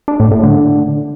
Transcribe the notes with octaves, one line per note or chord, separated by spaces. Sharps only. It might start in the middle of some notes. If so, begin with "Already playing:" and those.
D4
A2
A2
D3